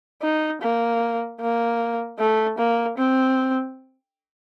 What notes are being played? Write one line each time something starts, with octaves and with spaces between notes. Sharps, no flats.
D#4
A#3
A#3
A3
A#3
C4